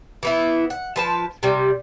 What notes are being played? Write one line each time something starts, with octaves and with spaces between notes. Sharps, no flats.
E3 B3 E4
F#5
F3 B4 A5
C3 G3